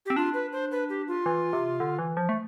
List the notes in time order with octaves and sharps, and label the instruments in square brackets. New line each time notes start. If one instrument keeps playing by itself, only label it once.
[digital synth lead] C4 [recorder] G4
[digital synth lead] D4 [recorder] F4
[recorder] B4
C5
B4
G4
F4
[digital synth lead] E3
C3
D3
E3
F3
A3